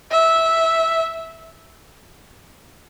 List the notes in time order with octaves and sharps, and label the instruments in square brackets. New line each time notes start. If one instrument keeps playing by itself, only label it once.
[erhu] E5